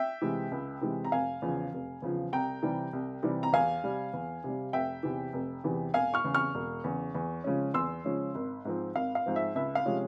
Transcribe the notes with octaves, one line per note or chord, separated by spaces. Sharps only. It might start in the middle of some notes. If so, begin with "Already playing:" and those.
Already playing: E5 G5
C3 E3 G#3
C#2
C3 E3 G#3
A#5
F1 F5 G#5
E2 C#3 F3
F1
E2 C#3 F3
C2 G5 A#5
C3 E3 G3
C2
C3 E3 G3
A#5
E2 F5 G#5
C3 G3
E2
C3 G3
F1 E5 G5
E2 C3 E3
F1
E2 C3 E3
E1 F5 G#5
C#6 F6
E2 C#3
C#6 F6
E1
E2 C#3
E2
C#3 F3 G#3 C#4
E2 C6 E6
C#3 F3 G#3 C#4
G#1
G#2 F3 C4
G#1 F5
F5
G#2 F3 C4
E5
C#2 E5
F5
C3 F3 G#3 C#4